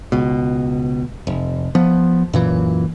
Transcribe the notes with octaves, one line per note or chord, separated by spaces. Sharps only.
C#2 B2
F1
F3 B3
F#2 A#2 E3